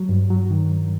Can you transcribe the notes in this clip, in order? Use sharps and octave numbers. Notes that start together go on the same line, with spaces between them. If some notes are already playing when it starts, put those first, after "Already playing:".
Already playing: F#3
G2
F#3
D#3